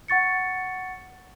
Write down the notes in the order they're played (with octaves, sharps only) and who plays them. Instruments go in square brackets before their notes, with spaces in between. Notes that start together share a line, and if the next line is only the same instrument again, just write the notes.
[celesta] F#5 C#6 A6 C#7